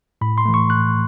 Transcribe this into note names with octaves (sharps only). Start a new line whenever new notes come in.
A2 B5
C6
E3 A3
C#6
A2 F#6